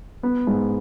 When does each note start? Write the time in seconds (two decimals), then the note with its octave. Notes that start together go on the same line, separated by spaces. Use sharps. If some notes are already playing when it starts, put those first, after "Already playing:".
0.23 B3
0.47 G#2